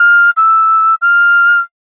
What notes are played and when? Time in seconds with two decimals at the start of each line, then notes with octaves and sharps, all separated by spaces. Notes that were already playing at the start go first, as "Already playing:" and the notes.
Already playing: F6
0.37 E6
1.02 F6